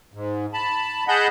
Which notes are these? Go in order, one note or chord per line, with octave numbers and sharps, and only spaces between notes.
G#2
A5 B5
G#4 D#5 F#5 A5 B5 G6